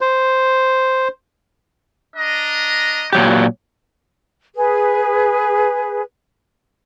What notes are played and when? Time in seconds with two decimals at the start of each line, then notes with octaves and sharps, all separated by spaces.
0.01 C5
2.16 D4 D#5 A#5
3.13 A#2 F#3 G4
4.55 G#4 B4